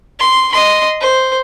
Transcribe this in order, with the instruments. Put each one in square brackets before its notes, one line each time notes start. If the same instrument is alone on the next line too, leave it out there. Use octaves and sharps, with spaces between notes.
[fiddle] C6
D#5 C6
C5